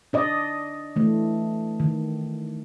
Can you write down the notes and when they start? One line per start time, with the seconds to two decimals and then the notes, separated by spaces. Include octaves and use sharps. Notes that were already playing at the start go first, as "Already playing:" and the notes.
0.13 D4 D5 D#5
0.96 E3 A3
1.80 D#3